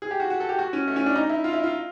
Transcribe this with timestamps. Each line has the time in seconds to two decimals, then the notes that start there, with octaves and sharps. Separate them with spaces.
0.02 G#4
0.11 G4
0.20 F#4
0.30 F#4
0.40 A4
0.49 G4
0.59 F#4
0.73 C#4
0.88 A3
0.96 C#4
1.06 D4
1.15 D#4
1.29 E4
1.44 F4
1.53 E4
1.64 F4